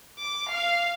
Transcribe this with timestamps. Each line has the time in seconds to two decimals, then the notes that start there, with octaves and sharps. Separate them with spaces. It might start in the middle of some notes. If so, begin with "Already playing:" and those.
0.20 D6
0.52 F5